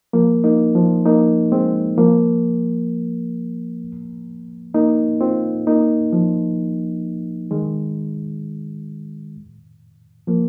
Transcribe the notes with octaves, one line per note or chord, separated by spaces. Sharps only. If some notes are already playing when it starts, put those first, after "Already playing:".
F3 A#3
A#3 D#4
F3
A#3 D#4
G#3 C4
F3 A#3
A#3 D#4
C4 F4
A#3 D#4
F3
D#3 G#3
F3 A#3